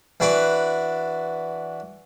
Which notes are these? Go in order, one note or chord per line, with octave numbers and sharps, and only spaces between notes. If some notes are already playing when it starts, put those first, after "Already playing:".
E3 D4 F#4 B4 D5